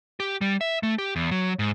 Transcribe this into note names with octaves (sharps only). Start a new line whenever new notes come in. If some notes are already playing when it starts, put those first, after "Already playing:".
G4
G3
E5
A3
G4
E2
F#3
G#2